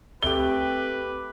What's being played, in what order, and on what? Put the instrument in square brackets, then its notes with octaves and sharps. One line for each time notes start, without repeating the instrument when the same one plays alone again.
[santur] A3 G4 [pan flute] C4 [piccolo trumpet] B4 [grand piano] G7